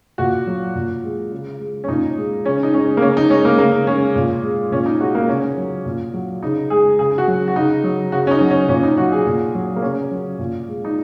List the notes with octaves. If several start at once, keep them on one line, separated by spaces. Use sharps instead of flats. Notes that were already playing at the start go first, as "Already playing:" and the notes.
A#2 F#4
F#3
A#2
G#3
C#3
G#3
C#4
A#2 D#4
G#3
C#3 C#4
D#4
G#3 C#4
A#3
C#3 C#4
D#4
G#3 C#4
A#3
C#3 A#3
G#3 C#4
A#2
G#3
A#2 C#4
D#4
G#3 F#4
A#3
C#3 C#4
F#3
A#2
F#3
C#3 D#4
G#3 G#4
C#3 G#4
F#4
F#3
F#4
C#3 D#4
F#3
C#3 F#4
C#4
D#4
F#3
C#4
A#2 C#4
D#4
F#3 F#4
G#4
A#2
F#3
A#3
C#3 C#4
F#3
A#2
G#3
D#4